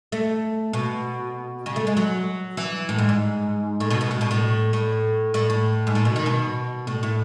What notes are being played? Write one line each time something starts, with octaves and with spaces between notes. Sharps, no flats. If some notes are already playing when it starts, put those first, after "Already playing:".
A3
B2
C#3
A3
G#3
F#3
E3
A2
G#2
G#2
A2
B2
B2
A2
B2
A2
A2
A2
A2
G#2
A2
B2
D#3
B2
A2
A2